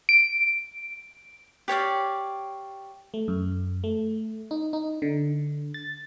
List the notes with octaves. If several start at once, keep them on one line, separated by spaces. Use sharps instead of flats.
D7
G4 C#5 D5 F5
A3
F#2
A3
D#4
D#4
D3
A6